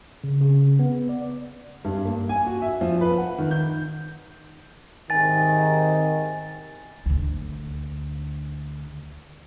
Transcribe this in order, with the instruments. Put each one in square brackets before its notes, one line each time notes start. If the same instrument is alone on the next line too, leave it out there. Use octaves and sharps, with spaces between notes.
[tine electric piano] C#3
C#3
B3
D5
[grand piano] G2
A#3
G#5
F#4
E5
F3
B4
F#5
D#3
G6
[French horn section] G#2 C3 D#3 [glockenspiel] G#5 A6
[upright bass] D2 D3